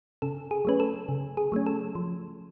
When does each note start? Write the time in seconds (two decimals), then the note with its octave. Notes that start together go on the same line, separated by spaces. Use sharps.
0.22 C#3 A4
0.51 G#4
0.65 F#3 A3 C#4 B4
0.80 A4
1.09 C#3
1.37 G#4
1.52 F#3 A3 C#4
1.66 A4
1.95 F3